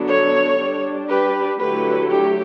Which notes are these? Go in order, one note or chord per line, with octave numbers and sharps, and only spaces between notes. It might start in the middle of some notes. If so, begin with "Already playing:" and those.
Already playing: D3 F#3 B3 D4
A4 C#5
G3 D4
G4 B4
D3 F#3 A3 E4 G4 B4
G4